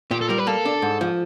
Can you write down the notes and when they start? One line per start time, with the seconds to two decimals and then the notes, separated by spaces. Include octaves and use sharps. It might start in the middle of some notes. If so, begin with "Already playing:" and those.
0.11 A#2 G4
0.21 A4
0.29 G3 A#4
0.38 B4
0.47 A#3 A4
0.65 D4
0.82 G#2
1.01 F3